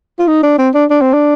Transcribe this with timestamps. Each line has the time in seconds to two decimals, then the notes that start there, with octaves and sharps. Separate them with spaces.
0.19 F4
0.28 D#4
0.43 D4
0.58 C4
0.74 D4
0.90 D4
1.01 C4
1.13 D4